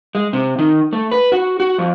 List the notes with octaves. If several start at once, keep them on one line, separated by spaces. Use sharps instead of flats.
G#3
C3
D#3
A3
B4
F#4
F#4
F2